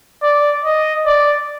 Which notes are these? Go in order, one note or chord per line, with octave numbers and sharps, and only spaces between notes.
D5
D#5
D5